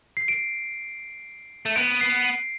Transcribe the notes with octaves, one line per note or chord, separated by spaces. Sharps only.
C7
D7
A3
B3 D7
C7